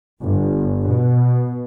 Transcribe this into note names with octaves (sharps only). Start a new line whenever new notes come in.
G1
B2